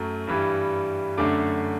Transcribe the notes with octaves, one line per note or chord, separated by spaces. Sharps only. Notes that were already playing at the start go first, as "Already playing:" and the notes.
Already playing: F#2 F#3 A3
G2 E3 G3
F#2 D3 A3 D6